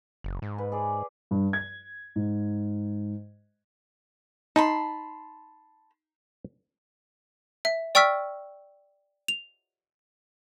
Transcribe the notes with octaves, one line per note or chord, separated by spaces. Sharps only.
F#1
G#2
B4
G#4 D5
G2
G#6
G#2
D#4 A5 B5 C6
E5
D5 G5 C#6 E6 F6 B6
F7